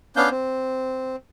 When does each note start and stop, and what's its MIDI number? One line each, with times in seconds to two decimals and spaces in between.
0.16 0.29 59
0.16 0.29 61
0.16 0.29 62
0.16 0.29 77
0.16 0.29 91
0.31 1.16 60